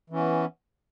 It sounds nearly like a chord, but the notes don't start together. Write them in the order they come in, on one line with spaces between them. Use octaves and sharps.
E3 C#4 B3